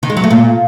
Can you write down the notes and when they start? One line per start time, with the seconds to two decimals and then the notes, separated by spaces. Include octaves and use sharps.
0.03 D#3
0.10 G#3
0.17 F#3
0.24 A3
0.31 A#2